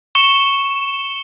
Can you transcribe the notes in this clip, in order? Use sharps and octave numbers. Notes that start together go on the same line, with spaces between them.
C#6 C#7 E7 G7